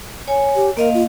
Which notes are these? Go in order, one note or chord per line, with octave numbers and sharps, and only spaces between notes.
C#5 G#5
G4
A#3 A#4 D#5 F5
F4